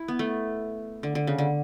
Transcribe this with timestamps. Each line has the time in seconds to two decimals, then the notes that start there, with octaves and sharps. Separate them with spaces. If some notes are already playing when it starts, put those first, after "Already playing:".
Already playing: E4
0.08 B3
0.19 A3
1.03 D3
1.15 D3
1.27 C#3
1.38 D3